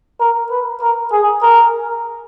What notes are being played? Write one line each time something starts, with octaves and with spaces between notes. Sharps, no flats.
A#4
B4
A#4
G#4
A#4